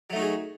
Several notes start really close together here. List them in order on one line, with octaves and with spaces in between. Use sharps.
F#3 A3 D#4 F#4 G#4